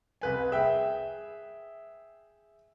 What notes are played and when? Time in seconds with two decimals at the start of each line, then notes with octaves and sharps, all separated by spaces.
0.21 C2 B4 G#5
0.51 G#4 E5 G5